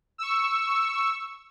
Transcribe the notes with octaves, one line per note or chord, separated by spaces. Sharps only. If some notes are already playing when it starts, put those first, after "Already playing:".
C#6 E6